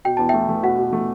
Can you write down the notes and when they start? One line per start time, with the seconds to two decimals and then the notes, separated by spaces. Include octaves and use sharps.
0.05 B2 G5
0.17 E2 A5
0.29 A3 E5 G5
0.49 A3
0.63 B2 F#5
0.78 B2
0.93 A3